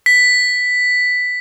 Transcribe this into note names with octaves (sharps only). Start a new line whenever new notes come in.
B6